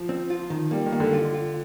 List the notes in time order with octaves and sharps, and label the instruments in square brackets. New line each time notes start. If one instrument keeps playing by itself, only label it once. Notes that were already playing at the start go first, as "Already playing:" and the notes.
Already playing: [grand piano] F3
[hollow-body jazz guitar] C4
F4
D#3
[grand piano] G3 [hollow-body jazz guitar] A#3
[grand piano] D#3
[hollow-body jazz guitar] A#3
[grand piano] D3
[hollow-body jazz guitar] F4
F4